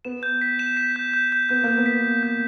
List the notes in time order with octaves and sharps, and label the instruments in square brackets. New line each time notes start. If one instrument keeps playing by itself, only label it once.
[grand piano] B3 [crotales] E7
[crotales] G6
B6
E7
B6
G6
G6
G6
[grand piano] B3 [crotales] G6
[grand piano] A#3
[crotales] G6
[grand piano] B3
[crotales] B6
B6
G6